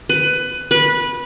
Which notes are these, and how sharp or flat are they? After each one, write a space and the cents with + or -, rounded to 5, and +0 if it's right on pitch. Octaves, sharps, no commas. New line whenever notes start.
B4 +20
B4 -15